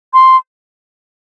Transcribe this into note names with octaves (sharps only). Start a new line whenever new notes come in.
C6